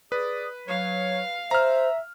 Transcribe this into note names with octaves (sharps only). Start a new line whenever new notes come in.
G#4 B4 D5 D#6
F#3 C#5 F5
C5 E5 A#5 F6